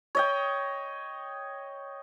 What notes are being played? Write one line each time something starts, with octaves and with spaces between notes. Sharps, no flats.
C#5 D#5 G5